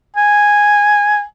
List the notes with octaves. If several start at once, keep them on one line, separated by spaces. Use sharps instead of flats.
G#5